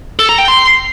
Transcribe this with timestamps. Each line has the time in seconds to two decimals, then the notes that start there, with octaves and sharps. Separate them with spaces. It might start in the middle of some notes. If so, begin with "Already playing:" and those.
0.19 A4
0.29 A#5
0.39 G5
0.48 C6